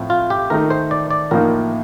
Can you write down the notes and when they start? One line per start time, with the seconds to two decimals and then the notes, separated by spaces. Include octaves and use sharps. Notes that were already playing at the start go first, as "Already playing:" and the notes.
Already playing: A2 F3 C4
0.10 F4
0.30 G4
0.50 D#3 A3 D#4 A#4
0.70 C5
0.91 D5
1.10 D5
1.31 A2 F3 A#3 D#4 A#4